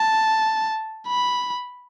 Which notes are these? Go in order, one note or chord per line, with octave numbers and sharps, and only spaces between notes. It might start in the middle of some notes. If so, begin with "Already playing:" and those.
Already playing: A5
B5